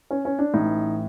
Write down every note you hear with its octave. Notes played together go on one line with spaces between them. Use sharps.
C#4
C#4
D4
A1 A2 E3 D#4